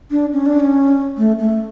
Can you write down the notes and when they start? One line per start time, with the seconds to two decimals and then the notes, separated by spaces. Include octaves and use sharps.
0.11 D4
0.33 C#4
0.46 D4
0.60 C#4
1.17 A3
1.39 A3